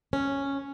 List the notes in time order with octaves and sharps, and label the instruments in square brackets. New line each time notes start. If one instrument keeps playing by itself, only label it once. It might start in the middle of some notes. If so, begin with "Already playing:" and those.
[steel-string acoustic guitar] C#4